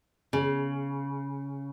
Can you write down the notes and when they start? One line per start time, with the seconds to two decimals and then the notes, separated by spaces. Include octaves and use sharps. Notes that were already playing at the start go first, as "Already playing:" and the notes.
0.33 C#3